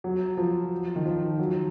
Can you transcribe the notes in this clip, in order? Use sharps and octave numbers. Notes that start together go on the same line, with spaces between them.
F#3
F3
D#3
F3
F#3